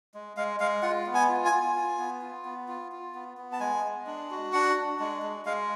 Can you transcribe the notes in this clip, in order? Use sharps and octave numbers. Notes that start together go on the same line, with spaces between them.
G#3
G#3 F5
G#3 F5
F4 F#5
B3
G#5
F4
G#5
F4
F4
B3
F4
B3
F4
F4
B3
B3
A5
G#3 G#5
G#3
D4
F#4
D4 F#5
D4
G#3
G#3
G#3 F5